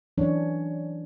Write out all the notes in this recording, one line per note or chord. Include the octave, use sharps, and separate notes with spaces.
E3 F#3 C#4 D4 C#5